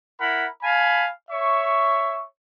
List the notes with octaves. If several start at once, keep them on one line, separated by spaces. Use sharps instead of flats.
E4 A#4 F#5 B5
F5 G#5 A5 B5
C#5 E5 C#6